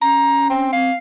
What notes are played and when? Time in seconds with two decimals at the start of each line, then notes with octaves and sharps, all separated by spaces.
0.02 C#4 A#5
0.50 C4
0.72 C4 F5